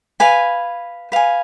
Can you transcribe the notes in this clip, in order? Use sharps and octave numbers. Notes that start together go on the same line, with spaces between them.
B4 F5 G#5
B4 F5 G#5